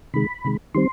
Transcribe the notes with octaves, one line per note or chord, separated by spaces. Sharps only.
C3 D#3 G#3 B5
C3 D#3 G#3
D#3 G3 C4 C6